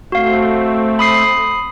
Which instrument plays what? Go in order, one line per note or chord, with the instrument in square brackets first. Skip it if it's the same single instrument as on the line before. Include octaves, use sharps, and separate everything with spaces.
[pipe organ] A3 C4 [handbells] F#4 F5
[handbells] B5 D#6 C7